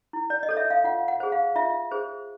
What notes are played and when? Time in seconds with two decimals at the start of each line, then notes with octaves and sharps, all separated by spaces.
0.13 E4
0.30 D5
0.43 D#5
0.49 A4 C#5
0.57 E5
0.70 F5
0.84 F4 F#5
1.08 F#5
1.20 G#4 C5
1.32 F5
1.56 F4 E5
1.91 G#4 C5